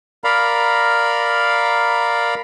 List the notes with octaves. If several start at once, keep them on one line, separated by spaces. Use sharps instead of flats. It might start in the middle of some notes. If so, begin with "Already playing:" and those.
A#4 D5 F5 A#5 B5